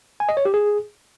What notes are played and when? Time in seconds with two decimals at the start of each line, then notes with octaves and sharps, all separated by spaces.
0.20 G#5
0.29 D#5
0.37 C#5
0.45 G4
0.54 G#4